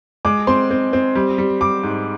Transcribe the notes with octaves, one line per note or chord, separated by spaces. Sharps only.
G#3 D6
C4 C6
C4
C4
G3
G3
G3 D6
G#2